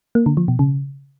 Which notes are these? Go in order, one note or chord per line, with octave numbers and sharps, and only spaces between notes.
A#3
D3
F3
B2
C#3